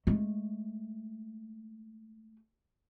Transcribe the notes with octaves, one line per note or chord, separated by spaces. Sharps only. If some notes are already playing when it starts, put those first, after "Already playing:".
G#3 A3